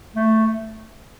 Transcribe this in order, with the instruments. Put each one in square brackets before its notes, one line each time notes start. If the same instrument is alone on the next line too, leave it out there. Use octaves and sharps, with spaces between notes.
[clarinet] A3